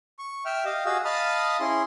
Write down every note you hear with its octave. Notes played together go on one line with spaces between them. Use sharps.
C#6
E5 G5 F6
G4 D#5 F5
F#4 G#4 D#5 F5 E6
D#5 F5 A5 B5 D#6 F6
C#4 E4 G#4 C6